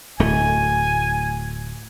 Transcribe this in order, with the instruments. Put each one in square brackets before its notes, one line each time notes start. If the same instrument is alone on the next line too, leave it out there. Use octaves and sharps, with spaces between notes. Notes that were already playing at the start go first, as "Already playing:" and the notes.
[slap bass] D1 A3 [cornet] G#5